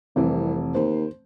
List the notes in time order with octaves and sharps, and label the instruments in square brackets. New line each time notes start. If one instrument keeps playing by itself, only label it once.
[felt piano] F1 E3 [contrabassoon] C2
[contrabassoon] D#2 [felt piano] C5